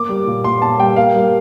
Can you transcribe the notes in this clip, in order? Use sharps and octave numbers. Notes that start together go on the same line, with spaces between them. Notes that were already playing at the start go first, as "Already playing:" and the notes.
Already playing: A#3 D6
G3
A#2
A#2 C6
A#3 A5
G3 G5
A#3 F5
G3